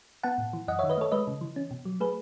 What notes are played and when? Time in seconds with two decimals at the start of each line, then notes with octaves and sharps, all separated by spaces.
0.23 B3 F#5 A5
0.38 A2
0.53 E3
0.68 F#2 D#5 F#5
0.79 D#3 C#5 E5
0.90 B4 D#5
0.98 A3 A4 C#5
1.12 G#3 B4 D#5
1.27 C#3
1.41 E3
1.56 C#4
1.71 B2
1.85 F#3
2.00 A3 G#4 B4